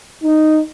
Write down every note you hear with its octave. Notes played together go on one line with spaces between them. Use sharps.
D#4